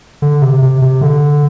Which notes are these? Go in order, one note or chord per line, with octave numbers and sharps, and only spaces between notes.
D3
C3
C3
C3
D3